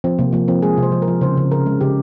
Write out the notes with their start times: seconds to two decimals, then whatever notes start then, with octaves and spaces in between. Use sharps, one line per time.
0.04 F3 C4
0.19 C3 A#3
0.33 F3 A#3
0.48 F3 C4
0.62 G#3 G#4
0.77 C3
0.83 C5
0.92 F3
1.02 A#4
1.08 F3
1.21 C#3 C5
1.37 C#3
1.52 C#3 A#4
1.66 G#3
1.81 C#3 G4